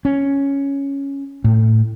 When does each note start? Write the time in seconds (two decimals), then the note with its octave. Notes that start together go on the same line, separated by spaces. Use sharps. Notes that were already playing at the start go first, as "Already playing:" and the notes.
0.05 C#4
1.44 A2